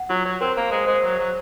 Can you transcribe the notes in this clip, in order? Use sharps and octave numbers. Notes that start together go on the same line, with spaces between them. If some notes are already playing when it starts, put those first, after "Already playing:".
Already playing: F#5
F#3 F4
F#3 C#5
C4 A#4
A#3 C5
G#3 C5
G#3 C5
F#3 C#6
F#3 C5